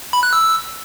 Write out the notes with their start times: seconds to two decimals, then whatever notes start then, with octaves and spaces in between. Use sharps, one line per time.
0.13 B5
0.23 F#6
0.33 E6